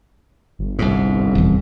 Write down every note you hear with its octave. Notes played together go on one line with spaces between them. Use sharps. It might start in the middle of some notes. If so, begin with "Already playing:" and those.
G1
C2 G#2
D#1 E2